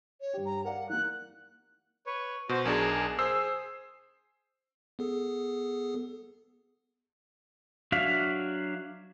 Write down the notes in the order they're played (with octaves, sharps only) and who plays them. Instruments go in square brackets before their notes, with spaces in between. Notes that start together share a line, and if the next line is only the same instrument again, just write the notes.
[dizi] C#5
[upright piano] G2 G4
[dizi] A#5
[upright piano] A#4 D5 F5 [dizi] F#5
[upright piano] E3 A#3 [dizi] F#6
[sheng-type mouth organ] B4 C#5
[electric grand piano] B2 [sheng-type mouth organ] F#4 C5
[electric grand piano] B1 D4 G#4 [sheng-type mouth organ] A#4 G#5 A5
[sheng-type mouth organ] G#4 [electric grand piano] C5 E6 C7
[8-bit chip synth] B3 G#4 A4
[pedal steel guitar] F#3 D4 F#4 E5 F5